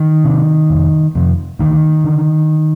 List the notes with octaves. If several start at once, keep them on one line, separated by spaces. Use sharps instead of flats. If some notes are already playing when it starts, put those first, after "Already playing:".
Already playing: D#3
C3
F1
F2 C3
D2 D#3
D3